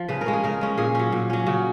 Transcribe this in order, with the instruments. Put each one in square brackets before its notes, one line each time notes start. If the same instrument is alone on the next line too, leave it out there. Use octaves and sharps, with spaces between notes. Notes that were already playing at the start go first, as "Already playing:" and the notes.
Already playing: [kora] F3
C#3 B4
A#4
G#3 C#4
G#4
C#3 A#4
G#3 C#4
A#2 G#4
F#3 C#4
A#2
F#3 C#4
C#3 F#4